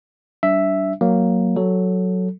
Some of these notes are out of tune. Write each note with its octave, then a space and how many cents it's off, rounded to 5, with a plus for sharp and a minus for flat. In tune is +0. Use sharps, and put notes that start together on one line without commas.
G3 -35 D4 -20 E5 +0
F#3 +0 A#3 +0
F#3 +0 A4 +0